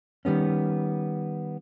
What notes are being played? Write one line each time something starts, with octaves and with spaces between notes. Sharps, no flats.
D#3 G3 B3 C#4